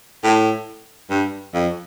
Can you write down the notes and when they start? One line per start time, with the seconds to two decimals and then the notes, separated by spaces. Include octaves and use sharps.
0.24 A2
1.10 G2
1.54 F2